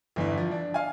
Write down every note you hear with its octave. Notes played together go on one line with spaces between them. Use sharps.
G1 E2 E4
F3
D4
F5 G#5